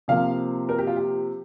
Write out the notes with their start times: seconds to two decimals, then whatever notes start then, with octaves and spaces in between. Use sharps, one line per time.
0.08 C3 F3 A#3 F5
0.69 A#4
0.78 G4
0.87 F4
0.96 G4